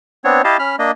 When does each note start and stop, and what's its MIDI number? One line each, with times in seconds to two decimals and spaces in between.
0.25 0.42 59
0.25 0.42 60
0.25 0.42 62
0.25 0.42 73
0.44 0.57 64
0.44 0.57 67
0.44 0.57 75
0.44 0.57 77
0.44 0.57 81
0.59 0.76 61
0.59 0.76 83
0.59 0.76 89
0.79 0.91 58
0.79 0.91 62
0.79 0.91 75